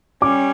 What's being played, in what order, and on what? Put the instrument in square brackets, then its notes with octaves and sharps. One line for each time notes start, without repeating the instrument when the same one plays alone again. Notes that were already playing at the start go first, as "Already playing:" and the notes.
[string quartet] G3 C#4 [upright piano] D6